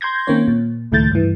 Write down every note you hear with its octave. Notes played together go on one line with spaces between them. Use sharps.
C6 G6 G#6 A#6
D#3 A#3 C4 C#4 C#5
A#2
C#2 A2 D#3 A3 G6 A6
G2 E3